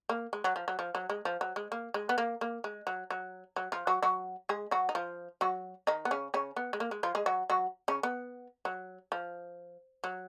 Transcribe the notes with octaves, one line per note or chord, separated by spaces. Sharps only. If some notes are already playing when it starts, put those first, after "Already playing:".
A#3
G#3
F#3
F3
F#3
F3
F#3
G#3
F3
F#3
G#3
A#3
G#3
B3
A#3
A#3
G#3
F#3
F#3
F#3
F3 F4
F#3 F#4
F#3 F#4
G#3 G#4
F#3 F#4
D#4
F3 F4
F#3 F#4
D#3 D#4
B3
C#3 C#4
C#3 C#4
B3
G#3
A#3
G#3
F3 F4
G#3 G#4
F#3 F#4
F#3 F#4
C#3 C#4
B3
F#3
F3
F#3